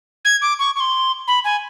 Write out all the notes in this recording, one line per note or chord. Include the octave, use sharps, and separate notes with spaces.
G#6
D6
C#6
C#6
C6
B5
G#5